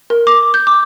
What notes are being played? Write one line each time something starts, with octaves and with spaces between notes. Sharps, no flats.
A#4
D6
G6
D6